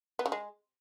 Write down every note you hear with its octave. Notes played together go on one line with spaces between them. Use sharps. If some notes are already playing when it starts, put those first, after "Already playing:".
B3
C#3
G#3